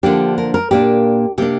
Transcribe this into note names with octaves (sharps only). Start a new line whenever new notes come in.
D3 F3 A#3 D4 G4
A#4
A#4
A#2 A#3 D4 G4
C3 A#3 D4 G4